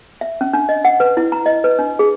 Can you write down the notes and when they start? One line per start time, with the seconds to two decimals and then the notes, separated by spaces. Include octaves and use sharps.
0.21 E5
0.41 C#4
0.53 D4
0.69 D#5
0.85 F#5
1.00 B4
1.17 E4
1.32 A#5
1.46 D#5
1.64 B4
1.79 D4
1.99 G#4